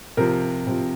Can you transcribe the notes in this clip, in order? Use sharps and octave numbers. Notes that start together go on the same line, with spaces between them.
C3 F3 A#4
C3 F3